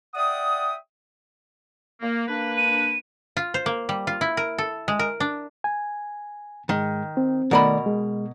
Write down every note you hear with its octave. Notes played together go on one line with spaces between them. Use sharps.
D5 E5 F#5 G5 D#6
A#3
A#3 D4 B4
D#7
F4
C5
A#3
G3
F4
E4
A#4
A4
G#3
A#4
D4
G#5
G#2 D#3 G#3
C4
B2 D#3 A3 A#4 D5 B5
G#3